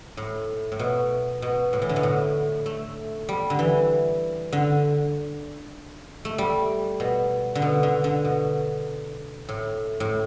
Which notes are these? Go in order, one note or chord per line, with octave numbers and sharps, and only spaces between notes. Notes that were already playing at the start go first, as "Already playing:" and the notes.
A2
A2
B2
B2
A2
E3
D3
B2
A2
A3
G3
D3
E3
D3
A3
G3
B2
D3
B2
D3
D3
B2
A2
A2